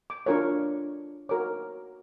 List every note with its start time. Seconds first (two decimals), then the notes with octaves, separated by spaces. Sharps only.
0.10 D6
0.26 D4 F4 A#4 C#5
1.29 F#4 A#4 C#5 D6